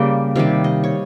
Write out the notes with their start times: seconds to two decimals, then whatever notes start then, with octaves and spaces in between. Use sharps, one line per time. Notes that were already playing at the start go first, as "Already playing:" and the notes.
Already playing: C#3 G3 A#3 G5
0.36 C3 D#3 G3 F5
0.64 D#5
0.84 C#5